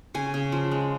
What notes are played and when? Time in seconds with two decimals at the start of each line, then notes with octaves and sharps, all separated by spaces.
0.14 C#3 G#5
0.34 C#3
0.52 F3
0.71 G#3